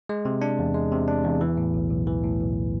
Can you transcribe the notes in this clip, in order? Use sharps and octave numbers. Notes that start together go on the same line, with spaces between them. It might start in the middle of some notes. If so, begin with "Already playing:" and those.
G#3
C3
D4
E2
G#3
C3
D4
E2
E3
A2
B1
B1
E3
A2
B1